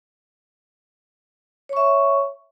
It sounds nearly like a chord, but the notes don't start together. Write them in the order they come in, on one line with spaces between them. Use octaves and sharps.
C#5 C#6 E5